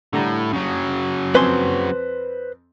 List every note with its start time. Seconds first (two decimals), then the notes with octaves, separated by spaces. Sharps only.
0.13 A2 D3 G3 A#5
0.53 C#3 F#3
1.35 F2 C4 B4 C5 G#5 C6